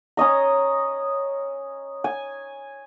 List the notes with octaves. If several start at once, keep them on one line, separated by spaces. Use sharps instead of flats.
C#4 C#5 D#5 A#5
G#5